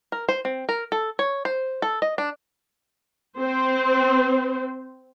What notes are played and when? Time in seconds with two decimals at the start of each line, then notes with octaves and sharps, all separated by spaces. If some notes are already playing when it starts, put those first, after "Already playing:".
0.12 A#4
0.29 C5
0.45 C4
0.69 A#4
0.92 A4
1.19 C#5
1.45 C5
1.82 A4
2.02 D#5
2.18 D4
3.39 C4 C5